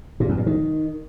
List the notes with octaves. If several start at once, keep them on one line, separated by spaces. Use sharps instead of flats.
A#2
E2
A#2
D#3